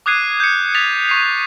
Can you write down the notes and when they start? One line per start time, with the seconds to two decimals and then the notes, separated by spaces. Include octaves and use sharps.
0.06 D6 D#6 F#6 G#6 C7 D#7
0.40 G6 C#7
0.74 D#6 A6 B6 C#7 F7
1.09 C#6 C7